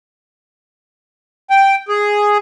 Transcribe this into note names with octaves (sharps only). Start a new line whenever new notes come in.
G5
G#4